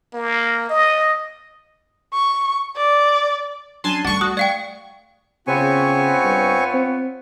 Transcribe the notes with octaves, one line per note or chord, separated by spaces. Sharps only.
A#3
D#5
C#6
D5
F#3 C#4 D4 G#5 A5 C6
G3 A3 D4 F#5 C#6 A6
F#4 D#6
D5 F5 G5 C#6
C#3 B3 C4 F4 C#5 G#5 C#6
G2
C4